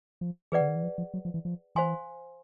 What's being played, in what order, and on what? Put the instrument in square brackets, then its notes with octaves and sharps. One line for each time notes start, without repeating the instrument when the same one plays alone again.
[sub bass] F3
[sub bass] E3 [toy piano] G#4 B4 D5 F#5
[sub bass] D3
D#3
E3
F3
F3
F#3
F3
E3
F3
[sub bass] E3 [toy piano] C5 F5 G#5 C6